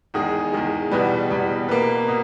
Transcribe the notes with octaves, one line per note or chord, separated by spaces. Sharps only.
E2 D#3 G#3 G#4
E2 D#3 G#3
E2 B2 G3 B4
E2 B2 G3
B2 A#3 B4
B2